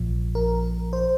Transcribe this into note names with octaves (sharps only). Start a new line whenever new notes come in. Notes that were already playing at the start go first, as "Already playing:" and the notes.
Already playing: A#1 A#2 F3
A#4
C5